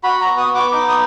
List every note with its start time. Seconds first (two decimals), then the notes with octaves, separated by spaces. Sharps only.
0.03 F#4 B5
0.21 B3 A#5
0.37 D#6
0.50 B3
0.55 D6
0.72 D#4 D6
0.89 D#6